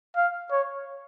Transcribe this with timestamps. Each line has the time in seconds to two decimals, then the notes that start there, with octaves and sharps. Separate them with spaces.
0.16 F5
0.51 C#5